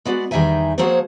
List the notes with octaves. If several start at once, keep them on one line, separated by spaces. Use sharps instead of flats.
G#3 B3 F#4 D5
E2 D#3 G3 D#4 E5 G#5
F3 F#3 A#3 G#4 C5 C#5